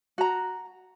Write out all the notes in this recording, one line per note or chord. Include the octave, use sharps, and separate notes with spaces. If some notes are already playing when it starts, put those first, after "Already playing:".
F#4 A#5